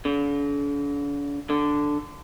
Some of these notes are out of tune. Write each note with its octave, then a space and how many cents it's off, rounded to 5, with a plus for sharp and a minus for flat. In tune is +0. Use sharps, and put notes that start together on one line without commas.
D3 -45
D3 +0